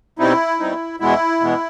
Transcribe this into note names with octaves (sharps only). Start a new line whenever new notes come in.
B2 G3 C4 D#4 E4
B2 G3 C4 D#4
E2 B2 G#3 B3 E4
E2 B2 G#3 B3